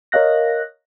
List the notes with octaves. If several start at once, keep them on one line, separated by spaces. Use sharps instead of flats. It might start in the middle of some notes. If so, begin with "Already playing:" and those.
A#4 C#5 D#5 F5 F#6 A#6